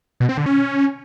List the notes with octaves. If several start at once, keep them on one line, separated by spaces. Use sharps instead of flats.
B2
C4
D3
C#4